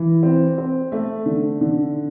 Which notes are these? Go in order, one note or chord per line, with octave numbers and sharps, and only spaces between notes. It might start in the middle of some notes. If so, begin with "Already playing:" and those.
Already playing: E3
C4
C4
A3
D3
D3